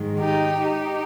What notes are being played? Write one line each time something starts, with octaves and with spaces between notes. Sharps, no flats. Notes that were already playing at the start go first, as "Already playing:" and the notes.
Already playing: G#2 D#3 G#3
D#4 G4
D#4 G4